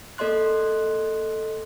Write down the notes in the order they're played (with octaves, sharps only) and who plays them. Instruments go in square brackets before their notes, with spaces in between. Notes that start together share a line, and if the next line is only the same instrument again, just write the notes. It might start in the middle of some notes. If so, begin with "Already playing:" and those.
[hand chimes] A#3 A4 D5 D#5 C6 F#6